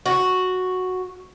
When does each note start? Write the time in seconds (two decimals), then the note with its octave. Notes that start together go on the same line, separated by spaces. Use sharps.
0.06 F#4